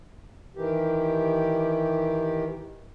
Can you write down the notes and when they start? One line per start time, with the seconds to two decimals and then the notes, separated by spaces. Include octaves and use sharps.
0.56 D#3 E3 G4